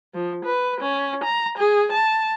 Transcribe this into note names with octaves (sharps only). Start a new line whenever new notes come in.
F3
B4
C#4
A#5
G#4
A5